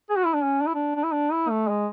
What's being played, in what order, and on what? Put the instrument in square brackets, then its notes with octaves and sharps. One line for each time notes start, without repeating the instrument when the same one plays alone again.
[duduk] G#4
F#4
E4
D4
C#4
D4
E4
D4
D4
E4
D4
E4
A3
G#3